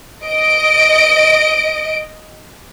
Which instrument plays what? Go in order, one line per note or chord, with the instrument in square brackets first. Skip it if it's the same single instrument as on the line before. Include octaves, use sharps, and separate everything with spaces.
[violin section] D#5 D7